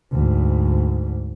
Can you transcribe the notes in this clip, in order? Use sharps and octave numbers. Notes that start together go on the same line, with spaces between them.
D2 G#2